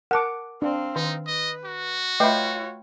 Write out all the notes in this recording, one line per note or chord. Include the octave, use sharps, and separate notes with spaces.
A#4 F#5 A5 D6
C4 D4 F5
D#3 D#4
B4 D#5
F#4
A3 F4 B4 C#5 E5 G5 B5